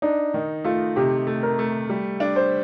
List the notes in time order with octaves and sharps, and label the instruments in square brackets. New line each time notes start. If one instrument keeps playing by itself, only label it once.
[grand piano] D4 [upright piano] D#4
[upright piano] D#3
[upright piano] A3 [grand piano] F4
[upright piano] C3 [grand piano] G4
[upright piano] A3
[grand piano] A#4
[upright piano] A3
G3
D4
[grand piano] C5